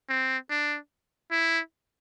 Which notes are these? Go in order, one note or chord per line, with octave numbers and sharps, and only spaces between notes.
C4
D4
E4